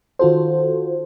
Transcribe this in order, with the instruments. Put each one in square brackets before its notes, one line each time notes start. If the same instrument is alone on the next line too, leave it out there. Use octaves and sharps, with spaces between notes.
[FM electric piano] D#3 F4 F#4 A4 C5